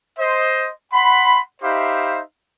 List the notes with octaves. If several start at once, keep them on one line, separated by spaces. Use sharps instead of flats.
C5 D#5
F#5 B5 C6
D#4 G4 C5 E5 F5 B5